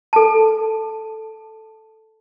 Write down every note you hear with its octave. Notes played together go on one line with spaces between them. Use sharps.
A4 A5